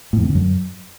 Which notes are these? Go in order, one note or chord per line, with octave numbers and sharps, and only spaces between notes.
A2
F2
C3
D3
F#2